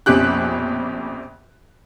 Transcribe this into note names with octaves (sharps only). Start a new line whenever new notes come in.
A#1 F2 B2 C#4 G4 F#6